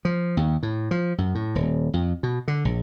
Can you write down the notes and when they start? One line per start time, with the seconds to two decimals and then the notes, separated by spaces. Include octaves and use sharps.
0.05 F3
0.37 D#2
0.63 A2
0.91 F3
1.18 F#2
1.35 A2
1.55 D#1
1.94 F2
2.23 B2
2.48 D3
2.65 A#1